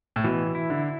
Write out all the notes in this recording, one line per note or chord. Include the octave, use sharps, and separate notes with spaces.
A2
B2 E3
E4
D3